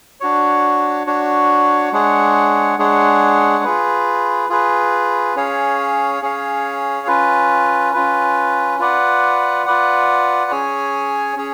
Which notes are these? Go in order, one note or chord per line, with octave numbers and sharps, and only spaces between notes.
D4 F#4 C#5
D4 F#4 C#5
G#3 D4 G#4 C#5 F#5
G#3 D4 G#4 C#5 F#5
F4 G#4 B4
F4 G#4 B4
C#4 G#4 C#5 F5
C#4 G#4 C#5 F5
C#4 F4 B4
C#4 F4 B4
F4 B4 D5 F#5
F4 B4 D5 F#5
C#4 G#4 C#5 G#5
C#4 G#4 C#5